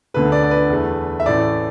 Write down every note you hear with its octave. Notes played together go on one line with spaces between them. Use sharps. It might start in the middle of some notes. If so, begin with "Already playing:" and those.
D2 D3 A3 B4
D5
D5
B4
E2 E3 A3
E5
A1 A2 E3 A3 D5